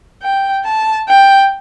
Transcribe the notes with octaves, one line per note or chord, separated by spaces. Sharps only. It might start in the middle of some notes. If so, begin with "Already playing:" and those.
G5
A5
G5